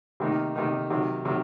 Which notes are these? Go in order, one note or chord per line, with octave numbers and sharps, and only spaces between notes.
C3 D#3 A#3 D#4
C3 D#3 A#3 D#4
C3 D#3 F#3
C3 D#3 F#3